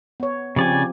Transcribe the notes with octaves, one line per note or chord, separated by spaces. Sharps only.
B3 C#5
C#3 F3 C4 G4 D5 G#5